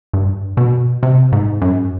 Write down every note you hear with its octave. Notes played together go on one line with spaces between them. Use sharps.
G2
B2
C3
G#2
F#2